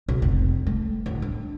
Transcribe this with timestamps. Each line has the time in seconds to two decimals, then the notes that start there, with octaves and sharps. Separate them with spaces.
0.08 B1
0.22 F1
0.67 A3
1.06 D1
1.22 D4